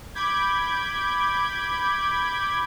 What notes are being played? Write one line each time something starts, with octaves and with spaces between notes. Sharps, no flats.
B5 D6 G6 G#6